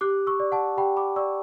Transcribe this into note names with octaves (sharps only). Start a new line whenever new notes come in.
G4 D6 F#6
C#6 E6
D5
F#5 A5
G4 G5 B5
B5 D6
D5 C#6 E6